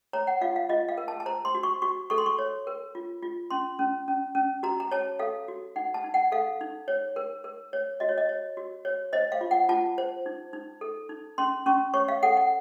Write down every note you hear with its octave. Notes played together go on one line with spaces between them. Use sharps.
C#5 A#5
F#5
F4 F5
F5
F4 D#5
F5
A#4
A5
A5
C5 A#5
C6
F#4
C#6
F#4 C#6
A4 C#6
C6
C#6
C#5
A#4
F4
F4
C#4 C6
C#4
C#4
C#4
F#4 A#5
A#5
C#5 A5
A4 F5
F#4
D#4 F#5
A5
D#4
F#5
A4 F5
D#4
C#5
A#4
A#4
C#5
F#4 D#5
C#5
D#5
C#5
F#4
C#5
C5 D#5
F5
F4
F#5
F4 A5
C5
D#4
D#4
A4
D#4
C#4 C6
C#4 C#6
C#5 C#6
F5
A4 F#5
F#5